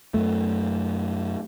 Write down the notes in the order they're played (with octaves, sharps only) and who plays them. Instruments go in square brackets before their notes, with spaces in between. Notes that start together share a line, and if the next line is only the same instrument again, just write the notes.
[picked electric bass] F#2 A3